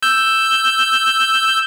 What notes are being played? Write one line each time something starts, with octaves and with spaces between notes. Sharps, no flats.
E6 G6